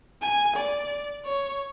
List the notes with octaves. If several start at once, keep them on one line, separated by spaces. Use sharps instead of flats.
G#5
D5
C#5